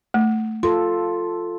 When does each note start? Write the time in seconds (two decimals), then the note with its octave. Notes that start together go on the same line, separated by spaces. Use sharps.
0.14 A3
0.63 F4 A4 C6